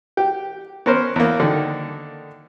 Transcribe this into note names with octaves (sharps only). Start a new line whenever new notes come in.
G4
B3 C#4 A#4 C5
E2 A#3
D3 D#3